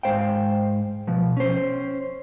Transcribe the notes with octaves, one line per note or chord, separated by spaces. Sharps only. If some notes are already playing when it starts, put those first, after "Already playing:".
G#2 C5 F5 G5
B2 F3
C#4 C5